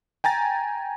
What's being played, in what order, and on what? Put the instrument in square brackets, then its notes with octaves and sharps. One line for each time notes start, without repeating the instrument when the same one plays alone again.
[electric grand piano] G5 G#5 A#5 A6